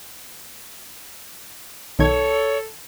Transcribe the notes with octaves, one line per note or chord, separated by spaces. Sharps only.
B1 D#3 A4 C#5 G#6